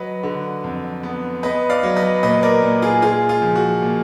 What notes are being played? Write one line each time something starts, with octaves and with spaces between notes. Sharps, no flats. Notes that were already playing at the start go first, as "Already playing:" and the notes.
Already playing: F#3 B4 D#5
D3
F2
B3
B3 B4 D#5
D5 F5
F#3
B4 D#5
A#2 B4 D#5
A#4 D5
A#2
F4 G#4
G#3 F4 G#4
F4
F3
F#4
A#2